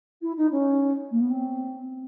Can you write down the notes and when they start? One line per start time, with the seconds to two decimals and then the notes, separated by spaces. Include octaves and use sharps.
0.21 E4
0.36 D#4
0.51 C#4
1.11 A#3
1.20 B3
1.30 C4